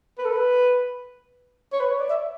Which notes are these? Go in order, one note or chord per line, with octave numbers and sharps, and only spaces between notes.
B4
A4
B4
C#5
B4
C#5
D5
E5